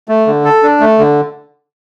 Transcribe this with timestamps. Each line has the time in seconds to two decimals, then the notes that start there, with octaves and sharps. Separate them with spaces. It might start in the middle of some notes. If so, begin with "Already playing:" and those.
0.09 A3
0.27 D3
0.44 A4
0.63 D4
0.80 A3
0.99 D3